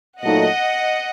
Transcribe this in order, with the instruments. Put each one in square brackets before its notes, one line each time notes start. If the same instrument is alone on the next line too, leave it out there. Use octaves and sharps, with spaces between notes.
[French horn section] A#2 F#3 A3 D#4 A4 [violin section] D#5 F#5